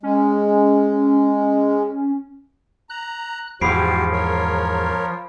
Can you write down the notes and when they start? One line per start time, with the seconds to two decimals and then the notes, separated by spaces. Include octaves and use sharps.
0.03 G#3 C#4
2.90 A#5 F#6
3.61 E2 G#2 F3 F#4 G4 B5 C7 D7
4.12 A#4 C#5